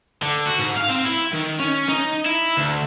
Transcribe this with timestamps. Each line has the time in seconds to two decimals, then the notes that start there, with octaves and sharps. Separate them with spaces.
0.23 D3
0.47 F#4
0.59 G#2
0.78 F5
0.91 C4
1.06 E4
1.33 D#3
1.60 C#4
1.89 D#4
2.26 E4
2.57 D2